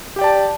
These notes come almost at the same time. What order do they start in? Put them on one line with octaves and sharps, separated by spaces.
G4 G5 D5 A5